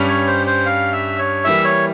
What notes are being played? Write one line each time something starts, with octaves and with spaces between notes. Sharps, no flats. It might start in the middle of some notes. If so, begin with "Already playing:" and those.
Already playing: G2 G3 C#4
C#5
C5
C5
F5
E5
C#5
E3 G3 A#3 E4 E5
C#5